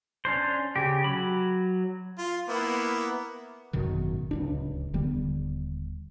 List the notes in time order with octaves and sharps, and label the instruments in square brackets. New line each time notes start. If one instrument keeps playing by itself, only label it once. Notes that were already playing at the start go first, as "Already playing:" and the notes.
[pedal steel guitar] C#4 D4 C5
C#3 G4
F#3 B5
[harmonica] F4
A#3 B3 E4
[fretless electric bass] G#1 F#2 B2 D#3
D1 C#2 D4
D#1 D3 G3 B3